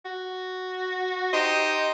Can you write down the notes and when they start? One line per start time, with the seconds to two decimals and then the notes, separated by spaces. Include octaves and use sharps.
0.05 F#4
1.33 D#4 G4 C5 D#5